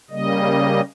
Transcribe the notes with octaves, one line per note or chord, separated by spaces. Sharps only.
C#3 G3 A#3 D#5